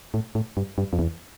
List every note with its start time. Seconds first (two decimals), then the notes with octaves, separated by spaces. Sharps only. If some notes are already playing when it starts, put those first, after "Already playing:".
0.14 A2
0.35 A2
0.57 G2
0.78 G2
0.93 F2
0.99 E2